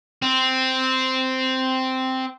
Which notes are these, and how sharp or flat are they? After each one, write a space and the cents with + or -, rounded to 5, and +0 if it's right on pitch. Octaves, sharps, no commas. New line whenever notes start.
C4 -5